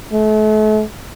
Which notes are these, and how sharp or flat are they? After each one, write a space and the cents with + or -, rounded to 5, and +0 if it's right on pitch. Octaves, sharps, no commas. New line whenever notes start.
A3 -40